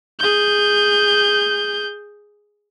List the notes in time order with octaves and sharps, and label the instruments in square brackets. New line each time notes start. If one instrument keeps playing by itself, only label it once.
[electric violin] G#4 G6